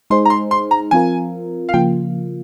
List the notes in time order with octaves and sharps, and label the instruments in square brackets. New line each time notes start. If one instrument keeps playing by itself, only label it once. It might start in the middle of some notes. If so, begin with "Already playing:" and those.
[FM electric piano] G#3 D#4 G#4 C5 [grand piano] C6
[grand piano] A#5
C6
C6
A#5
[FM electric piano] F3 C4 F4 A#4 [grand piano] G#5
[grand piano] F5
[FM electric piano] C#3 F3 A#3 F4 [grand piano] G5